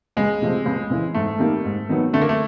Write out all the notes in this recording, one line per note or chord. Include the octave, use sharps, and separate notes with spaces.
C#2 G#3
C3 F3 A3 C4
C#2
C#3 E3
G#2 A3
D#3 G3 A#3
G#2
D#3 F#3 B3
D3 A3
A#3
A3